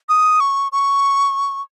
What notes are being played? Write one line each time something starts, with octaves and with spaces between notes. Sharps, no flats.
D#6
C#6
C#6